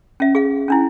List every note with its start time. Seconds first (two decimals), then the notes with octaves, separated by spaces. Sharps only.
0.20 C#4 E5
0.35 G#4 F5
0.68 C#4 D4 E4